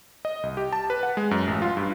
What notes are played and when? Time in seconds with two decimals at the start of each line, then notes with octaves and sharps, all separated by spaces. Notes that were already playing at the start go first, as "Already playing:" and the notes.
0.25 D#5
0.43 C2
0.57 G4
0.73 A5
0.90 B4
1.03 F#5
1.17 G#3
1.31 F#2
1.47 A1
1.62 F4
1.77 G2